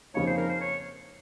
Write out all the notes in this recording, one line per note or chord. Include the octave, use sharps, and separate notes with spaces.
F2 C#3 F3 A#3 D#4 C#5
C5
A#4
C5
C#5